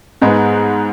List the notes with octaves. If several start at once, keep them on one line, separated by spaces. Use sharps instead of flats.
G#2 G#3 B3